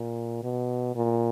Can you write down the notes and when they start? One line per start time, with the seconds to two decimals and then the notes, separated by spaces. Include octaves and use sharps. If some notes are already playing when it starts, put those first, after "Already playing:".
Already playing: A#2
0.43 B2
0.95 A#2